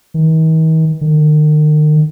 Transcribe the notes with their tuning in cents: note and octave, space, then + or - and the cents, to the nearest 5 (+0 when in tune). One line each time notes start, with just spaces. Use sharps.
D#3 +45
D#3 -40